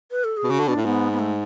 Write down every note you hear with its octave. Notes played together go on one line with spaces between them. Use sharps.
B4
A4
G#4
B2
C#3 F#4
D3
B2 D4
A2
G#2 B3
B3
A3